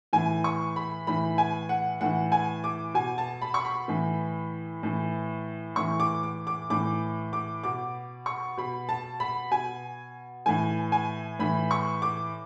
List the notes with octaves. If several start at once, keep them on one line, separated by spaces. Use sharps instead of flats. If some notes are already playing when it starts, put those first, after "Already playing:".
A2 E3 G#5
C#6
B5
A2 E3 B5
G#5
F#5
A2 E3 F#5
G#5
D6
B2 G#5
A5
B5
C#6
B5
A2 E3
A2 E3
A2 E3 C#6
D6
D6
D6
A2 E3 D6
D6
B2 D6
C#6
B2 B5
A5
B5
B2 G#5
A2 E3 G#5
G#5
A2 E3 B5
C#6
D6